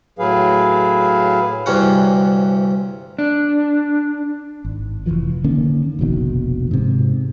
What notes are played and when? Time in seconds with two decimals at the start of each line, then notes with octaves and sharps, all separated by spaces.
0.19 A2 F#3 G#4 B4 F5
1.66 D2 G2 C3 E3 C#4 F#5
3.19 D4
4.65 G#1
5.06 F1 F2 E3 F3
5.44 D3 D#3 A#3 C#4
5.99 F1 A#1 B2 D#3
6.71 G#2 C3